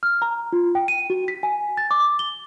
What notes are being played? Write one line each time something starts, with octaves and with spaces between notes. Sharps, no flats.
F6
A#5
F4
G5
D#7
F#4
B6
G#5
A6
D6
G7